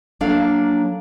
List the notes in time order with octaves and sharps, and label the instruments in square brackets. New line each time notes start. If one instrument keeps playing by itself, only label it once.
[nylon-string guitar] F#3 A#3 D4 A4 F5